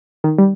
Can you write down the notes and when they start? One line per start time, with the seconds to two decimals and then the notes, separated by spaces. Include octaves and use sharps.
0.24 D#3
0.38 G3